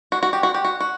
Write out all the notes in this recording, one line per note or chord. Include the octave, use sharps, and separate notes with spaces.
F#4
F#4
G4
F#4
G4
F#4
F#4